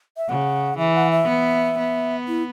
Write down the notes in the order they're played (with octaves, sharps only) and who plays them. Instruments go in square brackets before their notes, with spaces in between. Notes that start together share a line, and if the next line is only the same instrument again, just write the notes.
[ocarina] E5
[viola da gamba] C#3 [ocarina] F#5
[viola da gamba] E3 [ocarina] E5
[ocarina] F#5
E5
[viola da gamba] B3
B3
[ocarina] E4